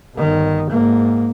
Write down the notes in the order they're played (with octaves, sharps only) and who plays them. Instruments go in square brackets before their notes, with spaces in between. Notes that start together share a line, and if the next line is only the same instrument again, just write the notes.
[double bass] G1 D#3
G#2 A#3